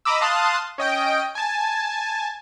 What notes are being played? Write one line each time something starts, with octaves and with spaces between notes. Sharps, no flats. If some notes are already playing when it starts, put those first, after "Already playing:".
D#5 A#5 B5 D6 E6
F5 A5 C6 D#6 F#6
C#4 D#5 G5 D7
G#5 A5